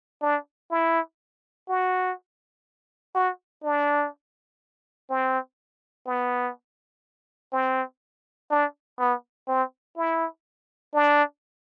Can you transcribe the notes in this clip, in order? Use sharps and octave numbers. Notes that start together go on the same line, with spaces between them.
D4
E4
F#4
F#4
D4
C4
B3
C4
D4
B3
C4
E4
D4